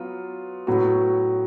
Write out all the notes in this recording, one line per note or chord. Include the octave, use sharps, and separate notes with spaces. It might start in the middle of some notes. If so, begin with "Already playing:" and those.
Already playing: F#3 B3 F4
A2 F#3 B3 F#4